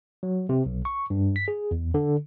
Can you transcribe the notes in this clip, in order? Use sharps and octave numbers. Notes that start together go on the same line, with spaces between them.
F#3
C3
B1
C#6
G2
B6
G#4
E2
D3